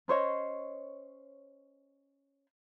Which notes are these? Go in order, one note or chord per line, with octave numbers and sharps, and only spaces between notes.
C#4 C5 C#5 D#5